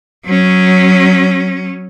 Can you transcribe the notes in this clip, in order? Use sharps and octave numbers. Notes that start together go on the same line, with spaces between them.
F#3 C#4